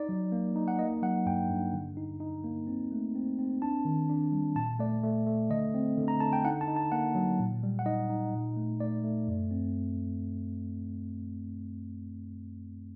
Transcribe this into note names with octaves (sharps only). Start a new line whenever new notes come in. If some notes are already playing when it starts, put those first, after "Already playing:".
Already playing: D#4 D5
F#3
A#3
D#4
F#5
A#3 D#5
F#3 F#5
G2 G5
G2
D3
D#4
D#4
A#3
C4
A3
C4
C4
D4 A5
D#3
D4
G3
A#2 A5
A3 D5
A3
A3
D3 D#5
C4
D3
A#5
D3 A5
G5
D#4 F#5
A5
D#4
A5
A#3 F#5
F#3
A#2
G3
F#5
D#4 D#5
D#4
A#2
A3
A3 D5
A3
F#2
C4